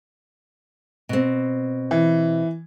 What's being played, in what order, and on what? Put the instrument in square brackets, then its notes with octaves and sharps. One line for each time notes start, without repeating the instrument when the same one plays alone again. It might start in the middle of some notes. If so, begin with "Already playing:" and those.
[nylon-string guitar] B2 C4
[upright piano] E3